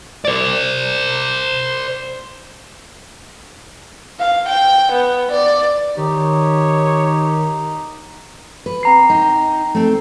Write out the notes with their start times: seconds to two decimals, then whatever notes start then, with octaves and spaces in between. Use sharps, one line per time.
0.25 C5 D5
4.20 F5
4.49 G5
4.93 B3
5.32 D5
5.97 D#3 D#4 G4 C#5
8.66 B4
8.83 C4 A#5 C7
9.10 D#4
9.75 A3 C4